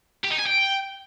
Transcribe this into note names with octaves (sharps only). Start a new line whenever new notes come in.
G4
D#4
G#5
G5